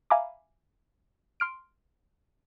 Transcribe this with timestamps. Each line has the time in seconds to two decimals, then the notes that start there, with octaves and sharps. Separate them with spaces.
0.10 E5 F5 G#5 A#5 B5 D6
1.40 C6 F6 D7